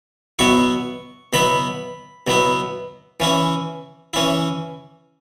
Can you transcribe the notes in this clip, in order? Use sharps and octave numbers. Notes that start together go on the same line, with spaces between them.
B2 F#3 B3 E4 C#6
B2 F#3 B3 E4 B5
B2 F#3 B3 E4
E3 C#4 E4
E3 C#4 E4